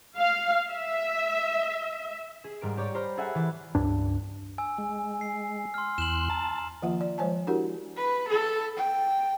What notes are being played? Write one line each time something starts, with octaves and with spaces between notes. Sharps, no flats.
F5
E5
G#4
G#2 G3 A#4 D7
G4 C#5 D5
G4 C5 A#5 B5 F6
G#4 A4 E5 F#5 G#5
E3 A5 A6
C#2 G2 D4
G#5 E6
G#3
C7
C6 F6
E2 C6 F#6 E7 F#7
A5 A#5
D#3 F3 A#3 F4 E5 F#5
D5
F3 G#3 C5 C#5 G#5 A5
D4 E4 F#4 G4 A#4 F#5
B4
A4
G5